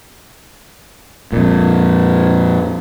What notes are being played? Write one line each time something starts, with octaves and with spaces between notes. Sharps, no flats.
F2 A#2